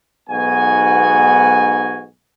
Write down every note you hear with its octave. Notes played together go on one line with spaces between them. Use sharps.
B1 G#2 B3 F#4 G#5